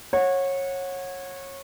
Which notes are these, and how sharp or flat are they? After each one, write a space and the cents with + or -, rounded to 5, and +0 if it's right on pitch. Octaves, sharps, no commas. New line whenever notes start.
C#5 -20 F#5 -20